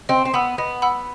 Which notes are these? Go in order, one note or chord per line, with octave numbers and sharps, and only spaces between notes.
C4 D#5
C4
B3 F#5 B5 E6
B3 D#5
F#5 B5 E6